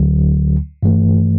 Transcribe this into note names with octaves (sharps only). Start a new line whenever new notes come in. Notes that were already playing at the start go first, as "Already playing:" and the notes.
Already playing: D2 D3 F#3
G2 E3 A3